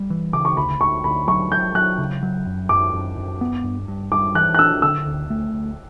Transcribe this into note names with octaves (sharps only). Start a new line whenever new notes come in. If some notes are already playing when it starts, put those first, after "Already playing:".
Already playing: G3
E3
C#3 D6
C#6
D2 B5
D2 C#6
D2 B5
F#3 C#6
F#3 G6
F#3 F#6
C#3
F#3
F#2
F#2 D6
F#2
F#2
B3
G2
G2
G2 D6
E3 F#6
F#6
D4 E6
D3 E6
D2
A3
D2